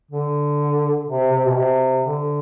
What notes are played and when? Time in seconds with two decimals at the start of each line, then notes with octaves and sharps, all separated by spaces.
0.11 D3
1.08 C3
1.32 C3
1.46 B2
1.56 C3
2.04 D3